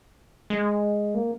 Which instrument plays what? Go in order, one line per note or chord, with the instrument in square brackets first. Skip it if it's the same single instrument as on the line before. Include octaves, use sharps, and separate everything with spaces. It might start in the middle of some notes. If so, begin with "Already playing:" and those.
[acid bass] G#3
A#3